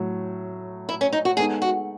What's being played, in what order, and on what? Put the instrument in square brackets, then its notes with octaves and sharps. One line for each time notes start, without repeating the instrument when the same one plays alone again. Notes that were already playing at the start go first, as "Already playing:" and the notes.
Already playing: [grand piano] A2 F#3
[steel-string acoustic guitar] E4
C#4
D#4
F#4
[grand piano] G#3 B3 D#4 A4 [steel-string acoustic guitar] G#4
[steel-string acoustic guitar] F#4